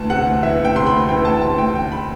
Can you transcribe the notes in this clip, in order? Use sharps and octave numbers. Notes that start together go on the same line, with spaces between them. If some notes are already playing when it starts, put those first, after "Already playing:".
Already playing: D2 E3 A5
C3 F#5
D2
E3 E5
D2
G5
C3 C6
B5
D2
E3 G5
D2 A5
C3 A5
D2 G5
E3 G5
B5